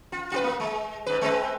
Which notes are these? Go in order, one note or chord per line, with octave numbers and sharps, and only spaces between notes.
F4
F4 F#4 B4
A#3
G#3
G#2 B4
G#3 C4 B4